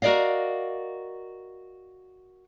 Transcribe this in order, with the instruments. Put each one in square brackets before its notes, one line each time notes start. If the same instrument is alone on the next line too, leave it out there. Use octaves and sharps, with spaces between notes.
[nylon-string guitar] F#4 A#4 C5 D5 D#5 F5